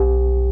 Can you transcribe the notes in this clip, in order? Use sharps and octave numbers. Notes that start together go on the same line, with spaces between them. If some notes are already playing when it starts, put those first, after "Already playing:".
Already playing: B1 G4